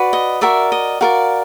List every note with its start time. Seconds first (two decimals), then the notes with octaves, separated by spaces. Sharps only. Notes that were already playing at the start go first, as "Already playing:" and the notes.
Already playing: F#4 B4 D5
0.13 D#5
0.41 F#4 A#4 D5 E5
0.72 D#5
1.01 F#4 A#4 D5 F5